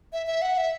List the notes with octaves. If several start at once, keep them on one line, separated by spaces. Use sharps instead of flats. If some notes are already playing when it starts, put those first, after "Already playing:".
E5
E5
F#5
E5